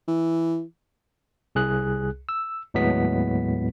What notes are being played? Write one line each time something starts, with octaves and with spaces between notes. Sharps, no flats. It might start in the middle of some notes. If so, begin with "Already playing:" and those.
E3
C2 G#4 F#6
E6
D#2 A2 F#3 G#3 B3 B6